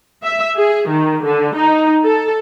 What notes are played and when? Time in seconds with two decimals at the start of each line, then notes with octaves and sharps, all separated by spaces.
0.23 E5
0.56 G#4
0.88 D#3
1.24 D3
1.55 D#4
2.04 A4